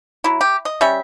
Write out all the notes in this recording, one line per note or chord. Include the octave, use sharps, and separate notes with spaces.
F#3 E4
G4
D#5
G3 C#4 E5